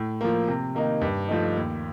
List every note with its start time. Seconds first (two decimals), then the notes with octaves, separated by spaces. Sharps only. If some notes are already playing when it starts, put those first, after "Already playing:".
Already playing: A2
0.21 F3 A#3
0.48 C3
0.75 D#3 A#3 D#4
1.01 G2
1.28 F3 A3 D#4
1.56 D#2